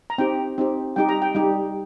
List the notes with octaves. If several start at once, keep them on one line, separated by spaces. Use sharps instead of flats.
A#5
C4 D#4 G4 G5
C4 D#4 G4
G3 D#4 G4 G5
A#5
G5
G3 D#4 G4